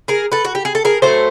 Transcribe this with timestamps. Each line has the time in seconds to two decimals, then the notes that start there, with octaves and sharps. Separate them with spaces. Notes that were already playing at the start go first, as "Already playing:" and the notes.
0.08 G#4 A#4
0.32 A4 B4
0.45 F#4
0.55 G4
0.65 G#4
0.75 A4
0.85 G#4 A#4
1.02 A2 F#3 A3 C5